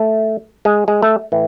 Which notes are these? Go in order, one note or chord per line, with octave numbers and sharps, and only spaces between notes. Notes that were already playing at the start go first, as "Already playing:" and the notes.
Already playing: A3
G#3
G#3
A3
A2 E3